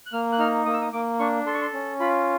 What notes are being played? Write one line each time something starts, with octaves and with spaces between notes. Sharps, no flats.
F#6
A#3 F6
F#6
D#4 F6
A#3 D#6
E6
D#6
A#3 D6
D4 C#6
A4 C6
C#6
C6
C#4
F4 B5